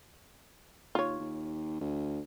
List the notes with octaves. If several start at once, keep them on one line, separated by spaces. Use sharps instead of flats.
D#2 F4 C#5
D#2
D2